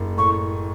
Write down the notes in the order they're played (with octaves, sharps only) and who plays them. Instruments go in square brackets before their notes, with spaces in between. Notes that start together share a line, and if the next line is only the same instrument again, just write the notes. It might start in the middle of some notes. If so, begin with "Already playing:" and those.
Already playing: [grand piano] F#1
[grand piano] A2 [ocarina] C#6